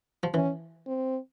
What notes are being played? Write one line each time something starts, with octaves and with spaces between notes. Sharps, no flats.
F3
E3 C#4
C4